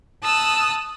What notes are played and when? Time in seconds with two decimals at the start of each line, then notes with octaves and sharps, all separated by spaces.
0.22 A5 D#6 E6 F#6